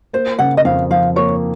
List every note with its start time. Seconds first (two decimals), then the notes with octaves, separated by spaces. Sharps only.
0.13 A#3 C5
0.39 C#3 F#5
0.57 D#5
0.65 F2 F5
0.90 F3 F5
1.16 A#3 C#5